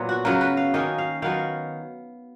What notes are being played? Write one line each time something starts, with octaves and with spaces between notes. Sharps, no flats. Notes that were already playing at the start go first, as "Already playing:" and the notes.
Already playing: A#2 F#3 B3
F#4
C#3 F#3 B3 A#4
B4
F5
D#3 A#3 C#4 D#5
F5
D#3 F#3 B3 F5